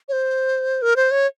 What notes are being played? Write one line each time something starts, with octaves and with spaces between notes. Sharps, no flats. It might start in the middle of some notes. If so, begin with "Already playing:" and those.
C#5
C5
A#4
C5
C#5